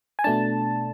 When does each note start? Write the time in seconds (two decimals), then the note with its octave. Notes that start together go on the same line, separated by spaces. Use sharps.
0.19 G#5
0.24 B2 A3 D4 A5